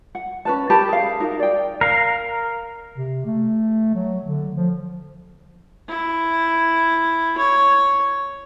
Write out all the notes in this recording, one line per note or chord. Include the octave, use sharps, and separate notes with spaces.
F#5
C#4 B4 A5
G4 A#4 A5 B5
G#4 F5
D#4 F#4 A#4
D5 G5
A#4 F5
C3
A3
F#3
D3
F3
E4
C#5